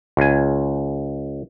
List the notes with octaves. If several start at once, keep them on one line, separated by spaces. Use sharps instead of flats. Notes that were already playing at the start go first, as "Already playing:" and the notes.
C#2 G#5